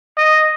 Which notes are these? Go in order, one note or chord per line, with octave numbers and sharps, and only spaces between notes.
D#5